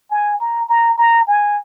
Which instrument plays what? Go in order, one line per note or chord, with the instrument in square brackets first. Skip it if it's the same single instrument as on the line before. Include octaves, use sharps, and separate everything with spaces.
[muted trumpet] G#5
A#5
A#5
A#5
G#5